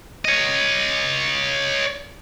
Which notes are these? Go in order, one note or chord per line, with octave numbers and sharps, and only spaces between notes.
C#5 D#5